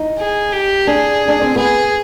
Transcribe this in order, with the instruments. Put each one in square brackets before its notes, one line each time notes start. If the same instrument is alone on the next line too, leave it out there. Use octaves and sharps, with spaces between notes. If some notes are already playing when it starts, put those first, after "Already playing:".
Already playing: [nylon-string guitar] D#4
[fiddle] G#4
G4
[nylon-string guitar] D4 [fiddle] G#4
[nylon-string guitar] D4
C4
[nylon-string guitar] B3 [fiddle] G#4